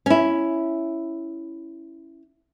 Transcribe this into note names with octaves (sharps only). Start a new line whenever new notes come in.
C#4 E4